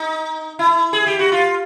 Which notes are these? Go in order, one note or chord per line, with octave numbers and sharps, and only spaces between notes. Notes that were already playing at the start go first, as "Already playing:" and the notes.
Already playing: D#4
E4
G#4
G4
F#4
F4